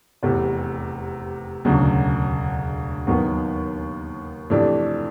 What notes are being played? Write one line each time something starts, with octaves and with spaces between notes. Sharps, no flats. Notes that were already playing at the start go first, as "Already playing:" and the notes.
F1 E2 C3
E1 D2 C#3 F#3
D#2 D#3 F#3 B3 D#4
F2 C3 E3 A3 D4